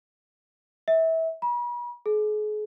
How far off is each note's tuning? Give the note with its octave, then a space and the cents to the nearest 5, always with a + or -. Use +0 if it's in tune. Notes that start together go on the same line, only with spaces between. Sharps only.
E5 -25
B5 -40
G#4 +40